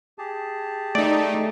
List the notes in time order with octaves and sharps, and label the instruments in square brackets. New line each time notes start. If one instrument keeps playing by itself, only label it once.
[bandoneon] G4 G#4 A5
[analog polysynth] A3 D#4 [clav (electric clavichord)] D5